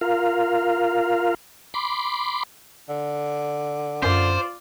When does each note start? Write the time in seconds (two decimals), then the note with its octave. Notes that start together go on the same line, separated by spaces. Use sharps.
0.01 F4 A#4 F5
1.74 B5 C6 D6
2.89 D3
4.02 F#2 F4 C5 D5